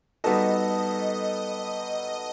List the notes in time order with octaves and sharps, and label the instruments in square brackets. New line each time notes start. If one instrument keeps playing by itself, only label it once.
[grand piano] G3 B3 D#4 F#4 A4 [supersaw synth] D#5